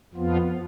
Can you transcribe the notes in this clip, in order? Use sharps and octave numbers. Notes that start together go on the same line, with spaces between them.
F2 F3 B3 F4